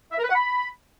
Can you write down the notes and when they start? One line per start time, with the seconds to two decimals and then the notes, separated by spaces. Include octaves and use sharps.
0.12 E5
0.18 A#4
0.24 B4
0.29 F#5
0.35 B5